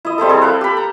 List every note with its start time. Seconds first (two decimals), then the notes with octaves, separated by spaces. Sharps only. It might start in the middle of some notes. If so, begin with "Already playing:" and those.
0.05 E4 D#5
0.18 G3 C4 E4 A4
0.29 C4 G#4 A4
0.42 B4 E5 F5 G5
0.61 G4 B5
0.77 A#5